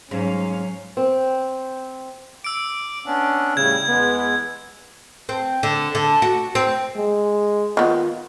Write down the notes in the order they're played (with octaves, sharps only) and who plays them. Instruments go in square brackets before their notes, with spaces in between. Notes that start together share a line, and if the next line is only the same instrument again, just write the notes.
[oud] G#2 [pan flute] F#3 [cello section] C#4 F5
[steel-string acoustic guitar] C4
[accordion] D6 [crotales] E6 D7
[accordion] B3 C#4 D4
[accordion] A2 G3 [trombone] C#3 [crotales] G#6
[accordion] E2 G#3 [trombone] B3
[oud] C4
D3
D3
F#4
C4
[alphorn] G#3
[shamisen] D#3 B3 [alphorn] F4